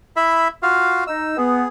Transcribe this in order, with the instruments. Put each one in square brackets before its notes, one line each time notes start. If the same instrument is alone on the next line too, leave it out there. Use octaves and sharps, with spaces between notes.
[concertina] E4 E5 B5
F4 F#4 F5
[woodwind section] D#4 [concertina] E6
[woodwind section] B3 [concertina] G#4